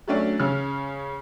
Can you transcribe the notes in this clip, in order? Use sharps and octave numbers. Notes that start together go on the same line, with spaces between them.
F#3 A3 C#4 D4
C#3 C#4 F6